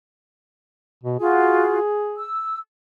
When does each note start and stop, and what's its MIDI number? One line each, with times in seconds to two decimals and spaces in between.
1.04 1.18 47
1.20 1.78 65
1.20 1.78 66
1.20 2.26 68
2.17 2.59 88